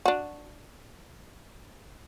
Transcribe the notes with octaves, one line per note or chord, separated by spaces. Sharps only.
D4 F#4